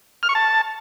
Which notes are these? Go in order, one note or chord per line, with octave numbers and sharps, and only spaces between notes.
F6
C#6
A5